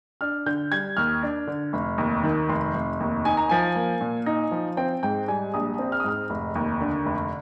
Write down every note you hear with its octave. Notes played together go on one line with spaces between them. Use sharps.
D4 F6
D3 G6
G3 G#6
D#2 F6
D4
D3
F1
D#2
D#3
F1 C6
F1
D#2
D#4 G#5
A#5
F3 G#5
A#3
A#2
D#4
F3
C4 G5
G#2 G5
G3 G#5
A#1 D#6
C4
F6
D#6
G#2 F6
F1
D#2
D3
F1